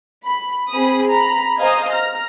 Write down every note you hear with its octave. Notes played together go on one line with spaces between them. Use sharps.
B5
C4 G#4 B5 D#6
A#5 B5
C5 D#5 F5 G#5 A#5 D#6
A#5 F6 A#6